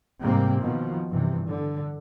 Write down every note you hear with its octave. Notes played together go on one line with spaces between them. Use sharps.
G#2 C3 G3 A#3 C4
B2 D#3 F3
G2 C3 E3
D3